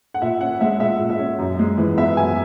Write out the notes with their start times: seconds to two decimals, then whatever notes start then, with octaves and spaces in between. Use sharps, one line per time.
0.14 F#5
0.22 A#2 E5
0.41 C#4 F#5
0.61 G#3 E5
0.80 A#2 E5
1.00 A#2
1.10 E5
1.19 C#4
1.39 F#2
1.59 G#3
1.77 E3
1.97 B3 E5
2.17 F#2 G#5